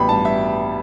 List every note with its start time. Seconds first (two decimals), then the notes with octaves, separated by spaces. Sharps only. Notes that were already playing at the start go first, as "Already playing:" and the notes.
Already playing: A1 G3 B3 G5 B5
0.09 G2 A5
0.25 G3 E5